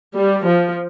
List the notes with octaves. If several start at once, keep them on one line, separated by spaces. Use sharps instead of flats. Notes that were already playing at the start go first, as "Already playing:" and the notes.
G3
F3